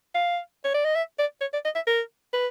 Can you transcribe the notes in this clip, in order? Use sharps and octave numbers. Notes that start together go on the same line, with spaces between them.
F5
C#5
D5
D#5
E5
D5
C#5
D5
D#5
E5
A#4
B4